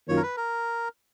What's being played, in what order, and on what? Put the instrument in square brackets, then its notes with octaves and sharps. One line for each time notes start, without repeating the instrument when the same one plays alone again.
[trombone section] F#2 D#3 A#3 F4 [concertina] C#5
[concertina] A#4
B4
A#4